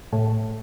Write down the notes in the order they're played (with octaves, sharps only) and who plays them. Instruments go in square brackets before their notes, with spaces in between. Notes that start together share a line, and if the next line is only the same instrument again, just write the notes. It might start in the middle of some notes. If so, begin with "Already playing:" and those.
[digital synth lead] A2